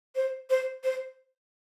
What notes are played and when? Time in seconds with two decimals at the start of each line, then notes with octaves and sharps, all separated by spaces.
0.15 C5
0.50 C5
0.84 C5